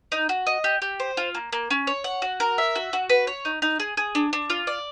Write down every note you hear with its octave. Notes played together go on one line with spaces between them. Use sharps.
D#4
F#4
D#5
G4
G4
C5
F4
A#3
A#3
C#4
C#5
F#5
F#4
A#4
E5
F#4
F#4
B4
C#5
D#4
D#4
G#4
G#4
D4
D4
F4
D5